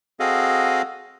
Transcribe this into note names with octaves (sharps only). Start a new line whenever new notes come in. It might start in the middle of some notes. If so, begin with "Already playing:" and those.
C4 F#4 G#4 A4 D#5 F5